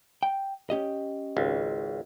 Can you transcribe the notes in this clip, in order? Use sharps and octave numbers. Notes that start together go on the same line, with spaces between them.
G5
C#4 G4 D#5
G#1 C#2